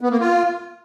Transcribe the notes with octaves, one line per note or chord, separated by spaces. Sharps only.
B3
A#3
F4